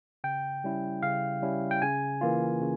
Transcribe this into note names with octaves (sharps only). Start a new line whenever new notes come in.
C#3 G5
G3 C#4 E4
C#3 F5
G3 C#4 E4
G5
C#3 G#5
E3 A#3 F4
C#3